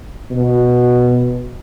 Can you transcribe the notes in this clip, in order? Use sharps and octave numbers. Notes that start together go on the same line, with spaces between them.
B2